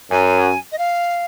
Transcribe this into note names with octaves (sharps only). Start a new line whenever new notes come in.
F#2 G#5
D#5
F5